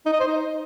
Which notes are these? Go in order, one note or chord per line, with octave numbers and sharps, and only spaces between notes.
D#4
D#5
C5
D#4